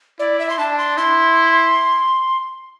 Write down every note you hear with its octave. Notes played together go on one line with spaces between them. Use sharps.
E4 D5
E5
C6
D4 A5
C6
E4 C6